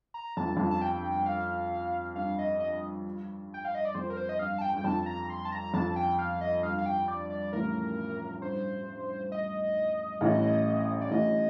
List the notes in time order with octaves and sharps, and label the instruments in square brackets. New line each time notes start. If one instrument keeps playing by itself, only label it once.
[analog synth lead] A#5
[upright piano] F2 [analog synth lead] A5
[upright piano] G2
F2
[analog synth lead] A5
G5
F5
[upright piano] G2 [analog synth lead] F5
[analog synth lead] D#5
D#5
G5
F5
D#5
D5
[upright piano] F2 [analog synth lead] C5
[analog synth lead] A#4
C5
D#5
[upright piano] G2 [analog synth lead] F5
[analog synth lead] A5
G5
[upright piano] G2 [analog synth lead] G5
[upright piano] F2 [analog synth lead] A5
[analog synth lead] A#5
C6
A5
A#5
[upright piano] F2 [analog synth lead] A5
[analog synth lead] G5
F5
D#5
[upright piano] G2 [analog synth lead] F5
[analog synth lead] F5
G5
D5
D5
[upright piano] A1 A2 [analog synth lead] A#4
[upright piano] G2 [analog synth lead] C5
[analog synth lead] D#5
[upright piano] A1 A2
[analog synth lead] D5
[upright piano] A1 A2 [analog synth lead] D#5